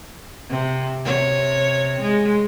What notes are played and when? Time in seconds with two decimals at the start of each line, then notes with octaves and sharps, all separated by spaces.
0.49 C3
1.05 C3 C#5
2.01 G#3